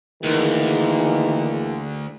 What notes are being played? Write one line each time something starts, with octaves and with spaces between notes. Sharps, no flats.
D2 D#3 E3 A#3 G#4